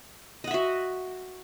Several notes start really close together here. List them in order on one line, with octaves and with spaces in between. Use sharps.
D#5 F#5 E5 F#4